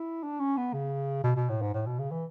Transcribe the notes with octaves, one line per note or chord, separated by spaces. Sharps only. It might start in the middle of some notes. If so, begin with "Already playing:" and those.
Already playing: E4
D4
C#4
B3
C#3
B2
B2
A2
G#2
A2
B2
C#3
E3